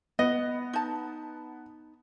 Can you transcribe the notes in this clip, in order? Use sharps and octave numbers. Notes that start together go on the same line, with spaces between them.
B3 D#5
D#4 A5